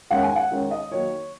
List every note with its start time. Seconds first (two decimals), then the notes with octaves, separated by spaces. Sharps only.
0.11 D#3 G#3 C#4 F#5
0.23 G#5
0.36 F#5
0.52 D#3 G#3 C#4
0.71 D#5
0.91 D#3 F#3 A#3 C#5